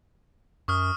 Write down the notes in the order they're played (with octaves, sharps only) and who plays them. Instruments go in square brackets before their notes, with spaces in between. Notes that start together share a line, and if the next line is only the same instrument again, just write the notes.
[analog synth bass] F#2 [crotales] C#6 D#6 F6